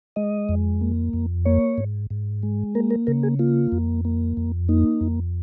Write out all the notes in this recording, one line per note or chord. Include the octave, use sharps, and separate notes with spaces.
G#3 D#5
F2
A#3
F2
A#3 C#5
G#2
G#2
G#3
A#3 A#4
A#4
C#3 A#4
G#4
A#3 F4
F2
A#3
F2
A#3 D#4
F2